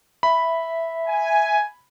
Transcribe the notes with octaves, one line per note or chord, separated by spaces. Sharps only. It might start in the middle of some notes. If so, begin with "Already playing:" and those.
E5 B5
G#5